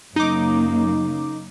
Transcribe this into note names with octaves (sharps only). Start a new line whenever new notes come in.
F#2 C#3 A#3 D#4 D6